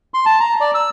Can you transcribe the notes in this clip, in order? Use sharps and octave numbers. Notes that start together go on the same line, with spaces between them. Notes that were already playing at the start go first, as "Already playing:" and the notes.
C6
A5
A#5
D5
E6